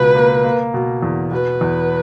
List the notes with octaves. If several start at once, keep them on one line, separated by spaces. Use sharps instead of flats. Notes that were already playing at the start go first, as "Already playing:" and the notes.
Already playing: C#2 B2 B4
A#3
A#3
B2
E2
B2 B4
E2